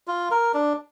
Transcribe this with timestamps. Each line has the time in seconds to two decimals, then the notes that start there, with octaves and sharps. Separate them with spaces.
0.07 F4
0.31 A#4
0.54 D4